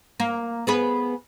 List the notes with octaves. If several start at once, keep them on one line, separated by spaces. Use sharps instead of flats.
A#3
B3 G#4 B4